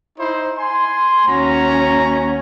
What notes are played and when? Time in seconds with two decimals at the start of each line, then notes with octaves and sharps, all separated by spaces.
0.19 D#4 E4 C5
0.58 G#5 C6
1.28 D#2 C#4 F#4 A#5